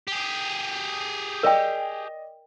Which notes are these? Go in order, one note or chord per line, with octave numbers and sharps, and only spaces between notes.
G4 G#4
A#4 D5 D#5 G5